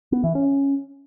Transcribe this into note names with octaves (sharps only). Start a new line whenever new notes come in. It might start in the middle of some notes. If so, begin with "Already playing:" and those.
B3
E3
C#4